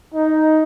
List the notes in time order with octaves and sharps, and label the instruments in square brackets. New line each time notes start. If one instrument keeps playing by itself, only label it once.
[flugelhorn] D#4